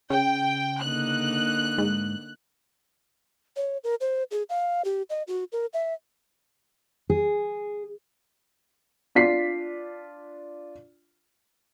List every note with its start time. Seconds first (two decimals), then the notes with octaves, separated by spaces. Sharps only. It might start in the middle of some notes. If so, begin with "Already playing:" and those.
0.10 C#3 G5
0.81 D3 A#3 D#4 F#6
1.78 G#2
3.56 C#5
3.84 A#4
4.01 C5
4.31 G#4
4.49 F5
4.85 G4
5.10 D#5
5.28 F#4
5.52 A#4
5.73 E5
7.10 G#4
9.15 D4 F4 B6 C7